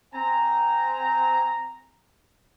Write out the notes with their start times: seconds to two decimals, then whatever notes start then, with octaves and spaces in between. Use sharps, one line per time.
0.14 C4 G#5 A#5